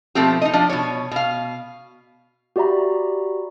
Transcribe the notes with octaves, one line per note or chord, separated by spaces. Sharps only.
B2 F3 A3 C4 G4
D#4 D#5
F3 D4
B2 C#5
B2 F5
F#4 G4 D5 E5 A#5 B5